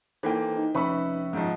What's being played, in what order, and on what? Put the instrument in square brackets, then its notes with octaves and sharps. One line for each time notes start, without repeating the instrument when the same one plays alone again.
[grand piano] E3 A#3 G5 [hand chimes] D#4 A4 C5
[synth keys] D#4
[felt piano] F1 B5 C#6 [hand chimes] C#4 E5 E6 [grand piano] B4
[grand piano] G#2 D#3 F3